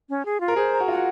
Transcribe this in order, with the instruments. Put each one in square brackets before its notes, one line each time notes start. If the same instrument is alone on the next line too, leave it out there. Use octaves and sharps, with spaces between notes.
[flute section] C#4
G#4
F4
[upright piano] A#4
[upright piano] G#4 [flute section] C5
[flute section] A#5
[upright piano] F#4
[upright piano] F4 [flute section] F#5
[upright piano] F#4